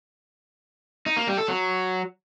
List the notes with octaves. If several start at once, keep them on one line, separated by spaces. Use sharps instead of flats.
D#4
A#3
G3
A4
F#3